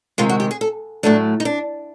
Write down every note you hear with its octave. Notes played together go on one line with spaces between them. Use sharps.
C3 D#3 G#3 F4
F#4
G4
G#4
A4
A2 F#3 A3 D4
D#4
D4